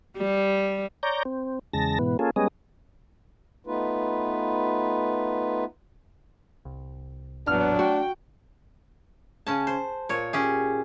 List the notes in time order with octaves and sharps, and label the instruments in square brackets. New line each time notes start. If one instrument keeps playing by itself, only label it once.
[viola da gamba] G3
[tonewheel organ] C#5 D5 A#5 G6
C4
E2 C#3 G#3 A5 A#6
G#2 B2 E3 B3
A#3 C#4 F4 G#4 A4
G3 G#3 B3 C#4 G#4 D#5
[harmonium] A3 B3 D#4 F4 B4
[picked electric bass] C2
[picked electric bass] A1 E2 A#2 [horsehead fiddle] F#3 B3 [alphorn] D4 [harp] F6
[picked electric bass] A3 [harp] F#4 [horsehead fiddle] G5
[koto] C#3 C#4 A5
C5
A#2 C#5
C#4 G4 G#4